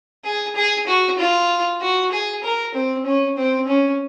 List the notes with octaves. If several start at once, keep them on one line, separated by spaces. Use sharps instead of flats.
G#4
G#4
F#4
F4
F#4
G#4
A#4
C4
C#4
C4
C#4